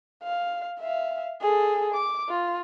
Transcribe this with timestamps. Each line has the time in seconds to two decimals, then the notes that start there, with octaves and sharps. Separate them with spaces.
0.24 F5
0.80 E5 F5
1.41 G#4 A4
1.94 D6
2.30 F4